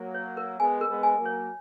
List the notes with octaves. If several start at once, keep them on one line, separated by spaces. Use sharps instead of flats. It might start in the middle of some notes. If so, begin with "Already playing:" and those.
Already playing: F#3 A#3
C#5
A#4
G#3 B3 G#5
A#4
G#3 B3
G#5
F#3 A#3
C#5